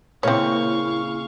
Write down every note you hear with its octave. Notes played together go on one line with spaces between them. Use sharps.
A#2 C#3 A#3 C4 E4 C#5 F5 C#6